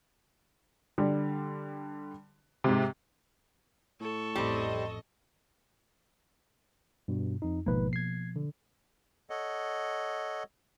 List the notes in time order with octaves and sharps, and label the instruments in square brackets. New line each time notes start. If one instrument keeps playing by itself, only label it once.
[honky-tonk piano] D3 G3
G#2 C3
[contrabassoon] A2 [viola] A4 C#6
[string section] A1 F2 D#5 [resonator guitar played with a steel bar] G3 C4
[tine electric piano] G2 B2
F2 D#4
[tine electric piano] G#1 G#2 B4 [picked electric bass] B2 F3 A#3
[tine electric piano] G#6 C7
D3
[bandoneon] A4 C#5 D#5 F#5